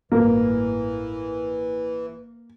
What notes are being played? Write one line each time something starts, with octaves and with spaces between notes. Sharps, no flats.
A1 G2 E3 A#3